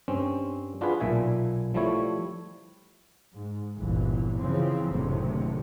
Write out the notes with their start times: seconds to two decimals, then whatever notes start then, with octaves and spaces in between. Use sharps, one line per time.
0.08 G2 C4 C#4
0.81 D4 F4 F#4 G#4 B4
1.00 B1 A#2 E5 G#5
1.74 F3 G3 A3 E4 C#5
3.35 G#2
3.77 G1 C2 A#2 E3
4.41 C#3 E3 F3 C4
4.88 F#1 D2 A2 C3 D#3